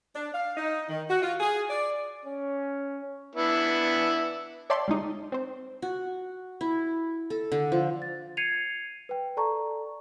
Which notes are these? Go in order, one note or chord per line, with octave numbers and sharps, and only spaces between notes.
D4
F5
D#4
D#3
F#4
F4
G#4
D5
C#4
B3 D4 E4
C#5 D5 E5 G5 A5 C6
G3 G#3 D#4
C4 C5
F#4
E4
A4
D3
F3
A6
G#6 C7 C#7 D#7 F7
B4 G5
A4 D5 A5 A#5 C#6